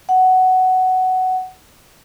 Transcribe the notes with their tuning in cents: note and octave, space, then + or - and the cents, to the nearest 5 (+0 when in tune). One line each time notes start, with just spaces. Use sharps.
F#5 +10